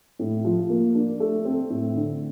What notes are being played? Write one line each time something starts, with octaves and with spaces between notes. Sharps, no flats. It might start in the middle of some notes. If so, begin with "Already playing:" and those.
A2
F3
A#3
D4
A3
C4
A2
D3